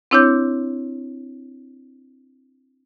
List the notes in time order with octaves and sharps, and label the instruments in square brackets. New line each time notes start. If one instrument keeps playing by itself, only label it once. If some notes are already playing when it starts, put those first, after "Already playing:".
[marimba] C4 D4 E4 C#5 D6 G6